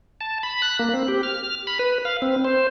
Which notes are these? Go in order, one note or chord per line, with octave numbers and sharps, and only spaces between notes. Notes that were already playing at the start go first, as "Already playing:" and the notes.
A5
B5
F#6
A#3
C4
G4
F6
B5
B4
F5
C4
C5